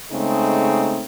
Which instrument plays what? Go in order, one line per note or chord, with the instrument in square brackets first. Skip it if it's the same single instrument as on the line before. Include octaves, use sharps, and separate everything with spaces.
[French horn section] C#3 G#3 A3 C4 D#4 G#4